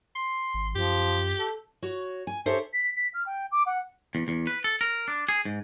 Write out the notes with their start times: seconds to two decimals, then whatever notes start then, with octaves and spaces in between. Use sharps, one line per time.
0.15 C6
0.54 G#1
0.75 F#2 F3 G4
1.39 A4
1.82 F#4 C#5
2.27 G#5
2.46 D#4 G4 A4 C5 C#5 E5
2.73 B6
2.96 B6
3.14 F6
3.26 G5
3.52 D6
3.66 F#5
4.15 E2
4.28 E2
4.47 B4
4.64 A4
4.81 A#4
5.08 D4
5.29 G#4
5.45 G#2